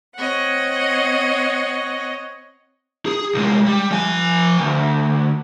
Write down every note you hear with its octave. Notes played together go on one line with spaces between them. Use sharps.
C4 C#5 D#5 F#5
G#4
C2 G#3
G3
F3 G#5
D2